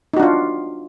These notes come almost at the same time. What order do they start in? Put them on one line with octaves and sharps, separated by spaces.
D#4 F#4 D4 F4